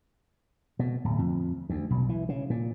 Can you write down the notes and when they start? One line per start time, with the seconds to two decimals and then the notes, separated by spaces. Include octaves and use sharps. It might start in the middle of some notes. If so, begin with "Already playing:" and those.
0.79 B2
1.04 D1
1.19 F2
1.69 D2
1.90 B1
2.09 E3
2.29 C#3
2.50 A#2